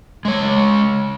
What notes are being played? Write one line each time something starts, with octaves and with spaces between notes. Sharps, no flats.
G#3 C#5